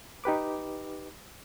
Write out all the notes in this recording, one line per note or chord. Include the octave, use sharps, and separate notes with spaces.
D#4 G4 B4 D6